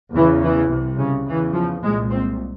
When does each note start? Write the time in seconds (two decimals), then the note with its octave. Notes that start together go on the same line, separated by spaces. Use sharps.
0.13 E2 C#3 E3
0.42 E3
0.70 C2 C3
0.98 C#3
1.26 E2 C#3 E3
1.54 F3
1.83 C2 A#2 G#3
2.10 C4